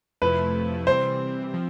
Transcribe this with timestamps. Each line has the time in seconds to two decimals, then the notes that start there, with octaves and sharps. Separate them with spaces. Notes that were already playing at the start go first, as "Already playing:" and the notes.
0.22 F2 C3 F3 A3 E4 B4
0.87 C3 E3 G3 C4 C5
1.54 F3 C4